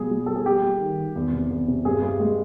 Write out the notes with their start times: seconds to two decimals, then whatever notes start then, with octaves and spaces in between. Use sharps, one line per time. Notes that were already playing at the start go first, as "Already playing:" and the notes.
Already playing: B2 F3 G3 G#4
0.11 G3
0.26 G3 A4
0.35 G#4
0.46 G3 G4
0.63 G3
0.80 D#3
0.98 D#3
1.16 E2
1.32 C3
1.51 E2
1.68 C3
1.85 G2 G#4
2.02 G2
2.20 G#3